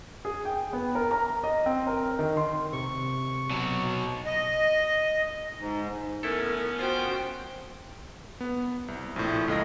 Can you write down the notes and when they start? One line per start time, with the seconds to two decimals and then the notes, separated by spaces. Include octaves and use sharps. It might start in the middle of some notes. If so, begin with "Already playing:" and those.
0.25 G#4
0.45 G5
0.73 B3
0.95 A#4
1.11 A#5
1.44 D#5
1.66 C4
1.87 A#4
2.19 D#3
2.37 C6
2.73 C3 C#6
3.51 B2 F#3
4.26 D#5
5.59 G#2
6.23 A3 B3 C#4 E4 A4 A#4
6.79 F4 F#4 C5 G5
8.41 B3
8.88 C2
9.16 A#1 A2
9.48 C#2 A3 D#5 A#6